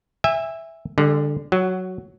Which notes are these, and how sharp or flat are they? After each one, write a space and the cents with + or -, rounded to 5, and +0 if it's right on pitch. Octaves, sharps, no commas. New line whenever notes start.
E5 +0 G#5 -35
D3 +0 G3 +45
F#3 +0 F#4 +20